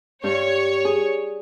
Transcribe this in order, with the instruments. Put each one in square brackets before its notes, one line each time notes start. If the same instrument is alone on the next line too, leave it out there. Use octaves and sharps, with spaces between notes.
[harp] G2 [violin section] C#5
[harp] G#4